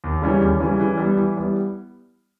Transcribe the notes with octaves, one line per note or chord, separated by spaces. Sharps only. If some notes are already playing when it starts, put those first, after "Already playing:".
D#2
C#3 E3 G3 C#4
D#2
C#3 E3 G3 C#4
E3
G3 B3 E4
E3
G3 B3 E4